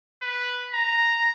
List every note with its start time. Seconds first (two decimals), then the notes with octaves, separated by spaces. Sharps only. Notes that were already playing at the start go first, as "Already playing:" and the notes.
0.22 B4
0.73 A#5